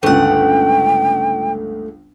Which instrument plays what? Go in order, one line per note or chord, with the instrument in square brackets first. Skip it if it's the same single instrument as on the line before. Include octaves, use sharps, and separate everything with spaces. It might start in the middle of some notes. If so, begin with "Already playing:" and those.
[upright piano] G1 C#2 [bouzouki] A3 F#5 [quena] G5